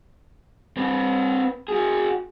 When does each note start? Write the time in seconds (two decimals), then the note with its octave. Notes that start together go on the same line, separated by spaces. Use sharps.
0.77 C4 B4
1.68 F#4 G#4